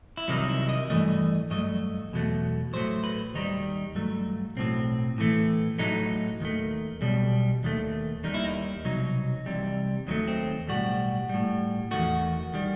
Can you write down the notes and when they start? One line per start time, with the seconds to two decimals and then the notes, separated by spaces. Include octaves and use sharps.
0.17 E4
0.28 C2 C3 D#3 F#3 D#4
0.49 E4
0.69 D#5
0.90 G2 E3 A3 D#5
1.50 G2 F#3 A3 D#5
2.12 E2 B2 F#3 A3
2.73 A2 F#3 A3 C5
3.04 B4
3.34 D#2 D#3 G3 D#4
3.95 G2 F#3 A3
4.57 B1 A2 F#3 C4
5.18 A2 E3 A3
5.79 A2 F#3 A3 D#4
6.40 D#2 D#3 A3
7.01 B1 B2 G3
7.63 D#2 D#3 A3
8.24 D#2 D#3 G3 D#4
8.34 E4
8.44 D#4
8.85 C2 B2 F#3 D#4
9.46 C2 C3 E3 G3
10.07 D#2 D#3 F#3 A3 C4
10.28 C4
10.69 B1 A2 G3 F#4
11.29 A2 G3
11.91 E2 D#3 A3 F#4
12.54 D#3 G3